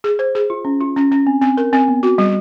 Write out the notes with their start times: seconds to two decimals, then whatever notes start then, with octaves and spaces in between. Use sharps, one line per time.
0.04 G#4
0.19 C5
0.35 G#4
0.50 F4
0.65 C#4
0.81 F4
0.96 C#4
1.12 C#4
1.27 C4
1.42 C4
1.57 A#4
1.73 C4
1.88 B3
2.03 F#4
2.18 G3